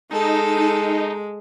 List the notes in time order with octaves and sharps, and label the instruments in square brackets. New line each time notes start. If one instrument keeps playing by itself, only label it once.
[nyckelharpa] G#3 [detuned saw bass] D#4 [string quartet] A4